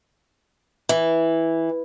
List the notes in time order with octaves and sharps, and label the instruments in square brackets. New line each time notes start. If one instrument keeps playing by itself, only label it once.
[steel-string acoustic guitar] E3